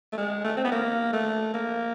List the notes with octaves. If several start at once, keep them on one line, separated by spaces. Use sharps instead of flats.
A3
G#3
A3
C4
B3
A#3
A3
A#3